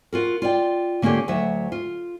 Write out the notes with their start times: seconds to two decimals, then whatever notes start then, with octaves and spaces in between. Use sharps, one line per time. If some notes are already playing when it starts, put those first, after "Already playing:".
0.13 F4 F#4 A#4
0.42 F4 D5 G5
1.02 D3 A#3 C#4 F4 G4
1.28 D2 F#3 E5
1.72 F4